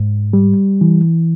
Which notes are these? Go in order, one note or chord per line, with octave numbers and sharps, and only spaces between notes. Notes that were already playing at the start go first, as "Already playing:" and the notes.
Already playing: G#2
G3
E3